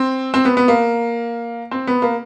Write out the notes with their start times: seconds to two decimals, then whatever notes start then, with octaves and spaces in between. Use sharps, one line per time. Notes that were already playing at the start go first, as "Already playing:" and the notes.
Already playing: C4
0.34 C4
0.45 B3
0.57 B3
0.68 A#3
1.71 C4
1.87 B3
2.02 A#3